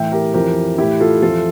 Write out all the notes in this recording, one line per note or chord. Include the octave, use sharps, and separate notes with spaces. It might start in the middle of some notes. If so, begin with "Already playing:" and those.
Already playing: A2 E3 E5 G5
G4 A#4
F2 E3 G4 A#4
A2 E3 E4 G4
F4 A4
F2 E3 F4 A4